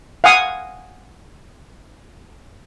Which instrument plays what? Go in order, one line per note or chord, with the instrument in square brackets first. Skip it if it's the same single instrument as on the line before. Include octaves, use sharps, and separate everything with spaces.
[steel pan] F5 F#5 G#5 D#6